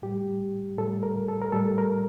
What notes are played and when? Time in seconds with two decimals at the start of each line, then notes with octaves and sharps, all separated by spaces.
0.02 A2 G3 G4
0.78 A2 G3 A4
1.03 A#4
1.28 A4
1.42 A#4
1.52 A2 G3 A4
1.78 A#4